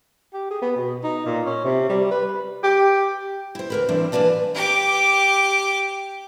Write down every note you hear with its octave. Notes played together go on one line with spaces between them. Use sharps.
G4
G#4
B3
B2
D#4
A#2
C#4
C3
G3
B4
G4
E4 C5
D2 A#4 B4
E3 C4 D4 E4
E3 A#3 B4 D5 A5
G4 D6